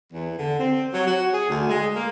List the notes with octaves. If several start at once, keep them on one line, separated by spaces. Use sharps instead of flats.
E2
D3
C4
F#3
F#4
G#4
D2
G#3
A#3